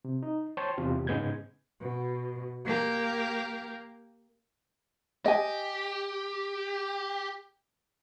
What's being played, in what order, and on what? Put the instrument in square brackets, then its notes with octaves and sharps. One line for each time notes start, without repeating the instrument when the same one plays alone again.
[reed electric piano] C3
D#4
C5 C#5 G5 A5 C6
E2 C3 F4 G4
G#2 C#3 G#3 B3 G6 G#6
[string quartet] B2
A#3 G4 A#4
[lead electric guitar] G4 [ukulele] D#5 G#5